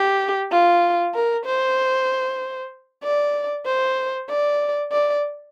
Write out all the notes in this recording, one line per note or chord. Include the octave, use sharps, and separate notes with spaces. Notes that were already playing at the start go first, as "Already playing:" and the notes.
Already playing: G4
F4
A#4
C5
D5
C5
D5
D5